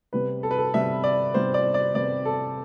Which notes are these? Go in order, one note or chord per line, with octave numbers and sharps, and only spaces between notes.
C3 G3 B3 B4
A4
B4
A4
C3 G3 B3 E5
D5
C3 G3 B3 C5
D5
D5
C3 G3 B3 D5
A4